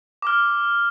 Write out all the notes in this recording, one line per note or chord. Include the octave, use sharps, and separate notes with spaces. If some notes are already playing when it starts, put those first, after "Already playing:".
D6 F6